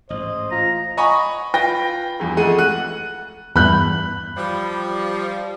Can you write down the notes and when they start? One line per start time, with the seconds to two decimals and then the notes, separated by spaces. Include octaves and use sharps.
0.10 A1 G#2 C5 D#5
0.51 F4 A#5
0.97 D#5 F#5 G#5 A#5 B5 C#6
1.54 F4 B4 G5 A#6
2.20 E2 G2
2.37 F2 G#3 A3 F#5 D#7
2.58 F#5 F#6 D#7
3.56 E2 G2 B5 F#6 G6
4.36 F3 G3